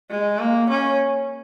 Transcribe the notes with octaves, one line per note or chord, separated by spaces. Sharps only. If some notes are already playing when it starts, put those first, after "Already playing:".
G#3
A#3
C#4